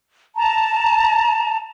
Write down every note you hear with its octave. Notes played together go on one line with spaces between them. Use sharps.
A5 A#5